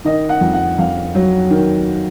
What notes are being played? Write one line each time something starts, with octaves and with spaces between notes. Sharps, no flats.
D#3 D#5
F#5
F2
F#5
F2 F5
F#3
D#3